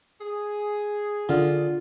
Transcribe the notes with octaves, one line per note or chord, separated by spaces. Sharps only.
G#4
D3 F4